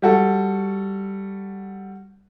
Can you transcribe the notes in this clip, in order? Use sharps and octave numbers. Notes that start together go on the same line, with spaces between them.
G3 F#4 A4